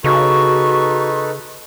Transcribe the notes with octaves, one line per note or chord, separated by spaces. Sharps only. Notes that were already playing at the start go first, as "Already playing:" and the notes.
C#3 D#4 F#4 A4 B4 C#6